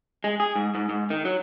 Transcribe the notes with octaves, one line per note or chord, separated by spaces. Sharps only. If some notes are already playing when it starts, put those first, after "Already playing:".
G#3
G#4
G#2
G#2
G#2
D#3
F#3